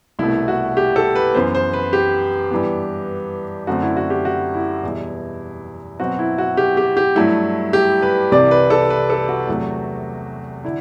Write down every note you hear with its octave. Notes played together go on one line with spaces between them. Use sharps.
C2 B2 A3 E4
F#4
G4
A4
B4
F#2 E3 B3 C5
C5
B4
G4
G2 E3 B3
F#2 D3 A3 C4 F#4
E4
F#4
G4
F#4
E4
E2 B2 G3
B2 F#3 C4 F#4
E4
F#4
G4
G4
G4
G2 F#3 A3 E4
G4
B4
C2 C3 E3 D5
B4
A4
B4
A4
F#4
E2 C3 F#3 A3
D3 E4